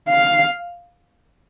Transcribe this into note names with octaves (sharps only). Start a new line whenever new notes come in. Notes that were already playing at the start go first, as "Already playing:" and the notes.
F5